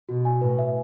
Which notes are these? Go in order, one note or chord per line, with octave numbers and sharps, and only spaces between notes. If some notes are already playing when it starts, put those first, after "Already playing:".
B2 F#4
G#5
A2 B4
E5